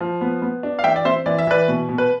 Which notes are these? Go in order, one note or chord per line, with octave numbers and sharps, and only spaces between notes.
F3
B3
B3
D4
F5
E3 E5 G5
D5
C4 C5 E5
E3 D5
E5
E3 B4 D5
B2
B2
B4